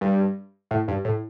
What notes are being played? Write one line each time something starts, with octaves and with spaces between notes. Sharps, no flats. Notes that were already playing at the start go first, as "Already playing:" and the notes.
G2
A2
G2
A2